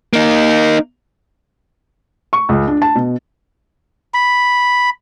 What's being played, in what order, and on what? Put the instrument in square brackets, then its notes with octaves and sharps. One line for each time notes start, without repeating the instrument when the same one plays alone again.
[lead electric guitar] A#3 D#4
[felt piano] C#6
C#2
D4
A5
B2
[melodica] B5